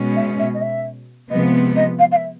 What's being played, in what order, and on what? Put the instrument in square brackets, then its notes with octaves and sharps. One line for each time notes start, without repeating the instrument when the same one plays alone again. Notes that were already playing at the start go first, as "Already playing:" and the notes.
Already playing: [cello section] B2 G#3 C#4
[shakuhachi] E5
E5
D#5
E5
[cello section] C3 F3 G#3 B3 [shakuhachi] D#5
[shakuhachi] D#5
F5
F5
E5